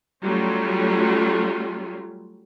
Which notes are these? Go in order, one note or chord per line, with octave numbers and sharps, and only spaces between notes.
F#3 G3 A3 C#4 F4